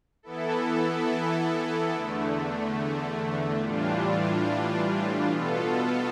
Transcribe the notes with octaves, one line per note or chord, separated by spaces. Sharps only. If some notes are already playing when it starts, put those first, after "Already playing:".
E3 B3 E4 A4
E2 D3 A3
A2 E3 G3 D4 F4
B2 B3 F4 A4